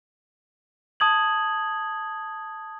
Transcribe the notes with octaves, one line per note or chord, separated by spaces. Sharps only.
A5 D#6 G#6 F#7